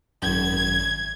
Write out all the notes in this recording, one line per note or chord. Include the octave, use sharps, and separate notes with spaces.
G#1 F#2 G#6